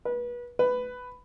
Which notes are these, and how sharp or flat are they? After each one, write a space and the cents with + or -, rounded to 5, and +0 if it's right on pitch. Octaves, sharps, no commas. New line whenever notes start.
B4 -30
B4 +10